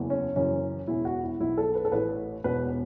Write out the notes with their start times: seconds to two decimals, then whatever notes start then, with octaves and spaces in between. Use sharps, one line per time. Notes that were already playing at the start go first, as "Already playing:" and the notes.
Already playing: F#1 E2 E3
0.10 C#4
0.36 F#1 F#2 E3 C#4
0.88 E1 E2 E3 E4
1.05 F#4
1.23 E4
1.40 B1 B2 E4
1.58 A4
1.75 B4
1.85 A4
1.92 A1 A2 E3 B4
2.44 E1 E2 B2 B4